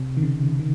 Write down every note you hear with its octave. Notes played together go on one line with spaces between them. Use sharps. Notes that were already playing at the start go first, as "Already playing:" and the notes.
Already playing: C3
D#3
C#3
D#3